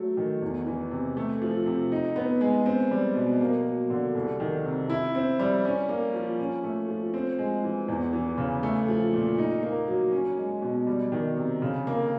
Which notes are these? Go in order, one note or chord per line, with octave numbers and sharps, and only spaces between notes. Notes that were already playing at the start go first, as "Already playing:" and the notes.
Already playing: F#3 A3
D#3
E2
E3
C3
A3
F3
C3
D#4
B3
G#3
C4
G3
B2
A#3
F#3
D3
C2
D#3
C3
E4
C4
G3
C#4
A#3
F3
C#4
A3
F3
C4
G#3
E3
E2
E3
C#3
A3
F3
A#2
D#4
A#3
F#3
C#4
G#3
B2
G3
D#3
C3
C#3
A#3